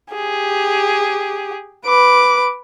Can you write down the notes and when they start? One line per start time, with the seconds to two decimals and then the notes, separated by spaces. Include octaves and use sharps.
0.14 G4 G#4
1.86 B4 D6